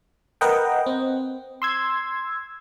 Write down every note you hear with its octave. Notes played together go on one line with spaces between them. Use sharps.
A#4 B4 D#5 F#5 G5
C4
C6 E6 G#6